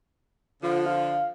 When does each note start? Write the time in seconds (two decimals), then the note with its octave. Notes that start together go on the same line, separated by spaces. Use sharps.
0.63 D3 F3 F4
0.86 F5